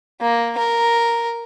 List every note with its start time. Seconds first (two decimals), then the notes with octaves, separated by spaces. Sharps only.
0.21 A#3
0.58 A#4